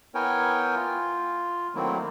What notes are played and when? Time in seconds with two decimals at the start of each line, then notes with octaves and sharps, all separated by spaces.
0.15 B3 E4 A#4 C#5 G5 G#5
0.75 F4
1.75 D#3 F#3 A3 A#3 C4 E4